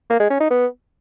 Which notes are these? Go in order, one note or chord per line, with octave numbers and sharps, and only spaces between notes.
A#3
G#3
C#4
D#4
B3